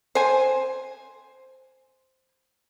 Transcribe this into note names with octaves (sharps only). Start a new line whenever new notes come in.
C5 G#5